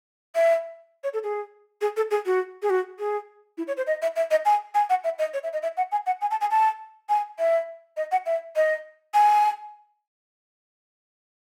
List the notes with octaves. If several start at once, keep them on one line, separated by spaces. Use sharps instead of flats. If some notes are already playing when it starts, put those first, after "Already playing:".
E5
C#5
A4
G#4
G#4
A4
G#4
F#4
G#4
F#4
G#4
E4
C#5
C5
D#5
E5
E5
D#5
G#5
G#5
F#5
E5
D#5
C#5
E5
D#5
E5
F#5
G#5
F#5
G#5
A5
G#5
A5
G#5
E5
D#5
F#5
E5
D#5
G#5